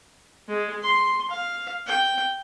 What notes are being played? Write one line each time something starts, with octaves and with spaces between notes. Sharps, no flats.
G#3
C6
F5
G5